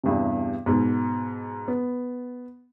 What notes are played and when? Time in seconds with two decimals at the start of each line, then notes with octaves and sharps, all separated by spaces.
0.04 E2 G2 C3
0.66 G#2 B2
1.68 B3